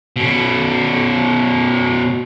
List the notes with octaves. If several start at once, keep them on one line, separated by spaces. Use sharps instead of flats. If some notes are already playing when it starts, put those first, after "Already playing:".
B2 C#4